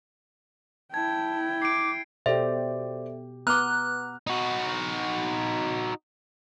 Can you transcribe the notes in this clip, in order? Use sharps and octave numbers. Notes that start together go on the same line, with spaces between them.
E4 G5 A5 G#6
D6 C7 D7
B2 G4 A4 C5 D5 E5
B3 A#5 D6 F6 F#6
D#4 F#4